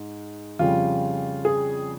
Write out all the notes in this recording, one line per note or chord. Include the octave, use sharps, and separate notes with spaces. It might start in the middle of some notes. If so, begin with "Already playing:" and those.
Already playing: G#2
F2 C#3 G3 F4
G#4